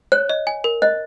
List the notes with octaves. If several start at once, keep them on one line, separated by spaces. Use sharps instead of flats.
C#5 F#6
D#5
G#5
A#4
D#5 F#6